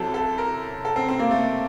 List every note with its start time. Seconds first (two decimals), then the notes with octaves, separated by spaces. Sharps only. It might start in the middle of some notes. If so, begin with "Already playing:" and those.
Already playing: C2 C3 F#3 A4
0.14 A4
0.38 A#4
0.85 A4
0.96 C4
1.08 C4
1.19 A#3
1.31 A3